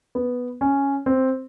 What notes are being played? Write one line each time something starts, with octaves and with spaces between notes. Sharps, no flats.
B3
C#4
C4